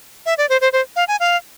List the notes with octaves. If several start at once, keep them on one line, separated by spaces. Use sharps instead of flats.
E5
D5
C5
C5
C5
F5
G#5
F5